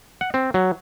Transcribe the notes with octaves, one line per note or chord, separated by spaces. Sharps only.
F#5
C4
F#3